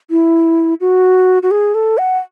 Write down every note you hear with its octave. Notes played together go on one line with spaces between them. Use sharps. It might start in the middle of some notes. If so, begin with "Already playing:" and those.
E4
F#4
F#4
G#4
A4
F#5